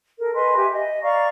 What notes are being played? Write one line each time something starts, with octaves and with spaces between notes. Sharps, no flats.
A4 A#4
B4 D#5 G#5 C6
G4 E5 G#5
D#5
D5 F5 A#5 C#6